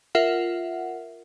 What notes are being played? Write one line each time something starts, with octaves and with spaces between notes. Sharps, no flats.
F4 A#4 E5 F#5